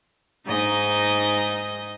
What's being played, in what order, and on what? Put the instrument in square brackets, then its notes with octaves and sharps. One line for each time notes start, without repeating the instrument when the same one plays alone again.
[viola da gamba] G#2 D#4 D#5